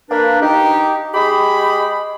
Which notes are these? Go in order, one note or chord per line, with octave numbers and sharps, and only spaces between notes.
A#3 D4 B4
D#4 G4
G#3 G4 G#4 B5